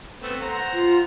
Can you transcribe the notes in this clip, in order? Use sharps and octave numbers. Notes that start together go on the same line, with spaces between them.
A3 B3 C4
C5 F#5 A#5
F4